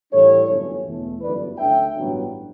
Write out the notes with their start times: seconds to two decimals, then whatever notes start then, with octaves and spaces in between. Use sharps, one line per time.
0.12 A2 E3 G3 D4 A4 C#5
0.48 G1 F#2 E3 A3 C#4
0.85 E2 B2 A3
1.21 G1 F#2 E3 A3 B4 D5
1.58 D2 D3 A3 C#4 E5 G5
1.94 A1 G2 F#3 B3 D4